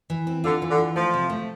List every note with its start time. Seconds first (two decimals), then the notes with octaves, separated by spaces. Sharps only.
0.10 E3
0.27 C4
0.44 D3 F4
0.62 E3
0.70 D3
0.78 F4
0.96 F3 A3
1.14 C3
1.30 A3